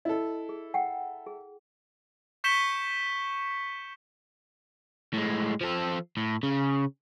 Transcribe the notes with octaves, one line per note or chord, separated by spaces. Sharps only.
E4 A4 D#5
G#4
F#5 G5
G#4
C#6 G6 B6 C#7 E7 G7
A2 G#3
F3 A4
A2
C#3